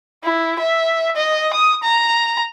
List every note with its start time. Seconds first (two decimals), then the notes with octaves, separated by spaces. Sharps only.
0.24 E4
0.59 E5
1.16 D#5
1.53 D#6
1.83 A#5